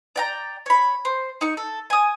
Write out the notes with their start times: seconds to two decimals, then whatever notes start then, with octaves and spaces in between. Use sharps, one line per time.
0.16 D5 G5 A#5
0.66 C#5 B5
1.05 C5
1.41 D#4 C#6
1.57 A4
1.90 G#5 D#6